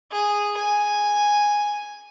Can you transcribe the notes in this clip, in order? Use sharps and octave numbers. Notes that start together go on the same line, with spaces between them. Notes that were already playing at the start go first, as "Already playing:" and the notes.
G#4
G#5